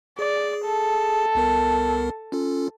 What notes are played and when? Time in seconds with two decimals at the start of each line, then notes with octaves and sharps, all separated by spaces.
0.19 G#4 D5
0.65 A4
1.35 C2 B3 A#4
2.32 C#4 F4 A4